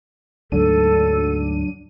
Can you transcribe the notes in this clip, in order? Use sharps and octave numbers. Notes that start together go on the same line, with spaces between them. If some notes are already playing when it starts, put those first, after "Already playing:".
D2 G#2 D3 F#3 D4 A4 D#7